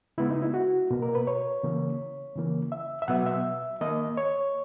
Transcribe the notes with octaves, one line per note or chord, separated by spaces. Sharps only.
C#3 G#3 B3 E4
D#4
E4
F#4
B2 A#3
A#4
B4
C#5
C#3 E3 A#3
C#3 E3 A#3
E5
E5
B2 F#3 B3 F#5
E5
D#3 A#3 D#5
C#5